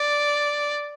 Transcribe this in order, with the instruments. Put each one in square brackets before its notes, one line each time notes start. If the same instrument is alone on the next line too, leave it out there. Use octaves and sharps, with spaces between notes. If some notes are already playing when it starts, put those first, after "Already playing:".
Already playing: [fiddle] D5